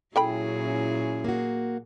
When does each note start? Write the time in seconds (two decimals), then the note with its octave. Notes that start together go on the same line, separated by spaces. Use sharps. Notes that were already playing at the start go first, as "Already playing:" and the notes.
0.16 A#2 F#3 C#4 E4 G#4 A4 G5 B5
1.24 A#3 F#4